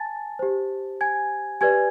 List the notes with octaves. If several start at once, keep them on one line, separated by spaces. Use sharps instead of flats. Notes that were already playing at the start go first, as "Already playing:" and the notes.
Already playing: G#5 A5 A6
G4 C5
G#5 G#6
G4 B4 D5 G#5 G#6